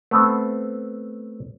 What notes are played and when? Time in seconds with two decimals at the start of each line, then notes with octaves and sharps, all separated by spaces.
0.11 A3 B3 C4